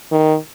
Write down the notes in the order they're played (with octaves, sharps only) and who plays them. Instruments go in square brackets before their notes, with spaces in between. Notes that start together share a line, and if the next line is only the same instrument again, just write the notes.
[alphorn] D#3